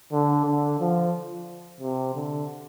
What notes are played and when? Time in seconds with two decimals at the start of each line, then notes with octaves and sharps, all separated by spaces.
0.13 D3
0.46 D3
0.80 F3
1.81 C3
2.15 D3